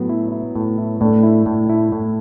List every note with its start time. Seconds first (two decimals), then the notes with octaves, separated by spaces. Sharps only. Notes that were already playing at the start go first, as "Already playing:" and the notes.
Already playing: A2 F#3 B3
0.09 E4
0.32 E4
0.55 A2
0.78 E4
1.00 A2 A3 D4
1.23 E4
1.46 A2
1.69 E4
1.92 A2